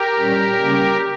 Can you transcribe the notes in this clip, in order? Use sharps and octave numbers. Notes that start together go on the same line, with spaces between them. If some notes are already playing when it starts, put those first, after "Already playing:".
Already playing: G4 A#4
A#2 G3 C#4
C#3 G3 A#3 C#4